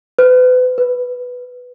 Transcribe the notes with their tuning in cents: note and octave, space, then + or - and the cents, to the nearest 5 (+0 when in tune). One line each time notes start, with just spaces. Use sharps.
B4 +35
B4 +0